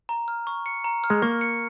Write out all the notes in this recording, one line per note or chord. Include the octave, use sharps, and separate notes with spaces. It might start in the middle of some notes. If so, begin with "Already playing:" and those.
A#5
F6
C#6
C#7
A#5
F6
G#3
A#3 C#6
C#7